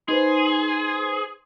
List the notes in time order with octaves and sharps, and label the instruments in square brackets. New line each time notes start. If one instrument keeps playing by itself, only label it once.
[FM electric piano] D#4 B4 C5 [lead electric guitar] G#4 [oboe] C6